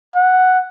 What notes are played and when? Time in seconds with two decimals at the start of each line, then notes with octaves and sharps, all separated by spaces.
0.15 F#5